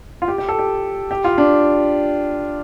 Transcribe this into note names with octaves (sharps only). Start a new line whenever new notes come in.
F4
G4
G4
A4
G4
G4
F4
D4